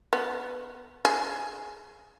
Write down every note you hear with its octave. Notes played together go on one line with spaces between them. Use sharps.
B3
G#4